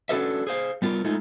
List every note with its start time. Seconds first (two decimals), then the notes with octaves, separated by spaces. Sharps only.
0.09 C#4 D4 F#4 A4 B4 E5
0.47 G#4 C5 F5
0.82 G3 B3 F4 G4 A#4
1.05 G#3 A3 D#4 F4